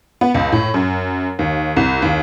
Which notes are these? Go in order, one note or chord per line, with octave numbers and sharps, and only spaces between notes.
B3
C#2
A2
F#2
D#2
C2
D#2